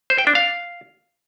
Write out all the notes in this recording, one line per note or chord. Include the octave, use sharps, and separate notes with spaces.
C5
G5
D4
F5